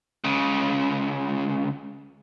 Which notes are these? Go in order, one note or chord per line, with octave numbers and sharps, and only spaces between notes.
C#2 C#3